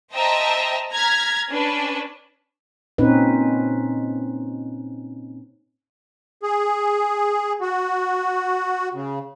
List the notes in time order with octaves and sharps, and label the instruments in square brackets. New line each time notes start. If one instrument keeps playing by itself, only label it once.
[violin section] C5 D#5 E5 G5 A5 A#5
A#5 F6 G#6 B6
C#4 D4 B4
[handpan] A#2 C4 C#4 D#4 B4
[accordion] G#4
F#4
C#3